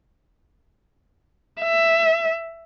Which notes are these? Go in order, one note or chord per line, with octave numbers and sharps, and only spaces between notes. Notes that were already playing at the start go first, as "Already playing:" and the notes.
E5